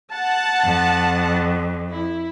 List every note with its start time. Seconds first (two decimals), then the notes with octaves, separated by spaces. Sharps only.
0.13 F#5 A5
0.63 F2
1.91 E4